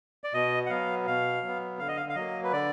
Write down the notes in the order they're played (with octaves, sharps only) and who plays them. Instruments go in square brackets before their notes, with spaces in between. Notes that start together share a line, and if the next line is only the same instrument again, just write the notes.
[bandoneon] D5
B2 D#5
F#5
F#3 B3 F5
B2 F5
F#3 B3
D3 F5
D#5
F5
F5
F#3 A#3 D#5
B4
D3 D5